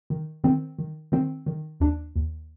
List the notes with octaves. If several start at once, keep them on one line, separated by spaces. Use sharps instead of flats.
D#3
D#3 C4
D#3
D#3 C4
D#3
D#2 D4
D#2